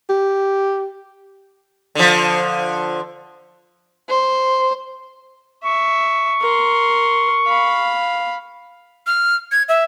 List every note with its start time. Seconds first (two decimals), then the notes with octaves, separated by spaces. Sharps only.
0.10 G4
1.95 D3 F3
4.08 C5
5.64 E5 C#6
6.41 A#4 C6
7.47 F5 B5
9.07 F6
9.52 G#6
9.69 E5